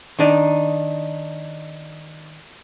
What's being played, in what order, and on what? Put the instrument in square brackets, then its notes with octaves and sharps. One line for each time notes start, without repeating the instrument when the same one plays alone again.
[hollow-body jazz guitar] D#3 D4 D#4